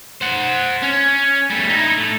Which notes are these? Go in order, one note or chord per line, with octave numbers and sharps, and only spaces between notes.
C5 F#5
C#4
G3 A3
D#4 E4
A2